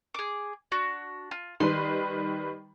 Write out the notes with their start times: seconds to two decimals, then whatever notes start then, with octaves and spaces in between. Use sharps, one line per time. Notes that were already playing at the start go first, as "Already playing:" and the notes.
0.14 G#4 D6
0.72 D4 F#4
1.31 F4
1.60 D#3 G3 B4 C6